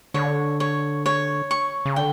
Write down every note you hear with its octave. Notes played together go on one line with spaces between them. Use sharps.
D3 C#5
C#5
C#5
C#6
C#3
D3 G5